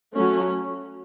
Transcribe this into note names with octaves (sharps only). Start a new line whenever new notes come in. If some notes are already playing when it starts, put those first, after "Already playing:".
F#3 A3 C#4